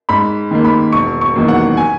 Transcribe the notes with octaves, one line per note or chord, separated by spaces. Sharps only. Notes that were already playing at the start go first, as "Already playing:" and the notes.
G#2 B5
D#3 A#3
B5
E1 C#6
C#6
E2 D#3 F#3 A#3
F#5
G#5